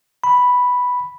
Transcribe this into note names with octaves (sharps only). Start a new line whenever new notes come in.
B5